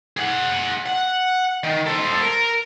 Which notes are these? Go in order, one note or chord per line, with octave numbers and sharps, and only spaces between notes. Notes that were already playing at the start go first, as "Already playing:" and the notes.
G#4 F#5
F#5
D#3
A4 C5
A#4